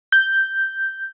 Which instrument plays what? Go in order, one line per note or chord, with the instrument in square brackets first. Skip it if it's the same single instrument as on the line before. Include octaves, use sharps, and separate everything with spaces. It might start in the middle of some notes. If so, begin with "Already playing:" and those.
[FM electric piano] G6